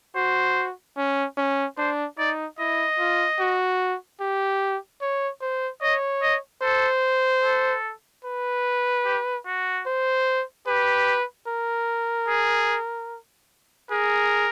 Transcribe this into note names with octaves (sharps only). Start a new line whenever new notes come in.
F#4 C5
C#4
C#4
D4 C5
D#4 D5
E4 D#5
F4
F#4
G4
C#5
C5
C#5 D#5
D#5
A4 C5
A4
B4
G4
F#4
C5
G4 B4
A#4
G#4
G#4 A#4